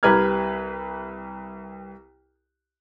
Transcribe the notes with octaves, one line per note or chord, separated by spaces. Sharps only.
C2 G4 B4 A#5 F6 G#6